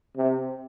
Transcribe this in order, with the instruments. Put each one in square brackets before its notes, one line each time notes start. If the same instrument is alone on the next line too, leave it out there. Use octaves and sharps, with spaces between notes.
[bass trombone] C3